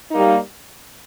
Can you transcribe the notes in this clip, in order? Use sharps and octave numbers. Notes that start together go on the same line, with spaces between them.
G3 A#3 D#4